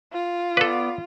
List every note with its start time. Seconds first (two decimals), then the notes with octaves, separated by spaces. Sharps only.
0.13 F4
0.57 B3 A4 B4 D5